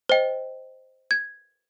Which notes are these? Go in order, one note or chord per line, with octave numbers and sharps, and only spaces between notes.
C5 D#5 G5
G#6